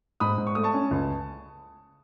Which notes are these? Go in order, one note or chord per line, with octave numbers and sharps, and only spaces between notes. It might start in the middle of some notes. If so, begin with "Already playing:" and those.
G#2 B5 D#6
G#2
C#6
A3 D#6
A5 C#6
C#4
C#2